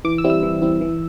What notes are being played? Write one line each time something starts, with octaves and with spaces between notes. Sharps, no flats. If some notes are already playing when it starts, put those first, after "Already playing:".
E3 D6
E6
G3 C4 E4
E6
E3
G3 C4 E4
E3